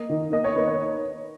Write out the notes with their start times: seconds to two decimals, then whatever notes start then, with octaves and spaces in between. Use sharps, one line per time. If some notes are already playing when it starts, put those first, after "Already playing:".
Already playing: A#3 D#5
0.09 D#3
0.32 A#3 D#5
0.44 C#5
0.55 A#3 B4
0.67 C#5